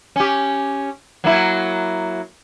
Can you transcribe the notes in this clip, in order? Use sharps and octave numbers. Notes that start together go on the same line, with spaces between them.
C#4 G4
F#3 A#3 E4